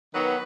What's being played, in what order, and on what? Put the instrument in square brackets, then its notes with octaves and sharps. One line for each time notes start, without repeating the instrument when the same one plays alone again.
[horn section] D#3 F#3 B3 B4